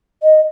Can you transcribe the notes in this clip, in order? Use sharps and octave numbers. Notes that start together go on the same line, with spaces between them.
D#5